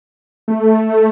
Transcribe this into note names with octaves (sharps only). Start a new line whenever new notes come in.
A3